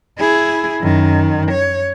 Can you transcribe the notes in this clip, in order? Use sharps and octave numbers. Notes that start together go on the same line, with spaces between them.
E4 G#4
F#2 D#3
C#5